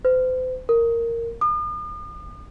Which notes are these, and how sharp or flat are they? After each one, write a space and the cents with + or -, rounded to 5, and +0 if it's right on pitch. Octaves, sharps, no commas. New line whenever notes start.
C5 -40
A#4 -10
D#6 -45